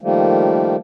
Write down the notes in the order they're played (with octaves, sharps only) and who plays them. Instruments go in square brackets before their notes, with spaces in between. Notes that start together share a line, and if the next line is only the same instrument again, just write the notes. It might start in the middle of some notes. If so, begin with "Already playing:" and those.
[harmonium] D#3 F3 G3 A3 A#3